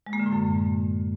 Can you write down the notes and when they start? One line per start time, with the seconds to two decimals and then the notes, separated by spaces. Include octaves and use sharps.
0.07 G#3
0.13 A#3
0.19 D3
0.26 A2
0.32 F#2